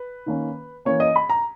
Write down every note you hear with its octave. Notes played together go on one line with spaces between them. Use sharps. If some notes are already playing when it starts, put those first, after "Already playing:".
Already playing: B4
D#3 A#3 C#4
E3 A#3 C#4 C#5
D#5
B5
A#5